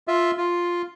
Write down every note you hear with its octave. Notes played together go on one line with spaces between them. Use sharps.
F4 E5
F4